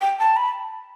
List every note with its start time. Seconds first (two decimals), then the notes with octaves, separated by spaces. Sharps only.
0.01 G5
0.19 A5
0.36 B5